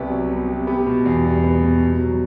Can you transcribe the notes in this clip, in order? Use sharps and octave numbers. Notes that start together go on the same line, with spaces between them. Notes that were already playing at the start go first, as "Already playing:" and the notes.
Already playing: C2 C3 B3 G4 B4
F#3
B3
C3
B3 G4
B2
E2
G3
B3
B2
B2
F#3